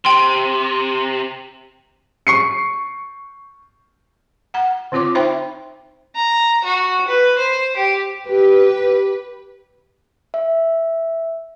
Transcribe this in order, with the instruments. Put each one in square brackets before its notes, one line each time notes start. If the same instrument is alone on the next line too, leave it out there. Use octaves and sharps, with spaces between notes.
[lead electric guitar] C3 [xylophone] G5 C6
[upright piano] C#6 C7 C#7
[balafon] F#5 A#5
D3 C4 F4 C#5 D6
D#4 C5 E5 G5 A#5 B5
[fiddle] A#5
F#4
B4
C5
G4
[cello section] G4 [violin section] B4
[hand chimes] E5